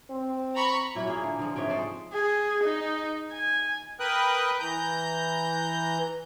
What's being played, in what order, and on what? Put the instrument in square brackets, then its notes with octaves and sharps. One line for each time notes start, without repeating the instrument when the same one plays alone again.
[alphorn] C4
[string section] A#5 B5 C#6
[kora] A#2 F#3 A#3 E4
A#3 G#4
D3
D3 F3
G#2 C3 C#5 G5
G#3 A4 C5 D5
[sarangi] G#4
D#4
G#5
[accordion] A#4 B4 G5 D#6 F#6
E3 A#5 G6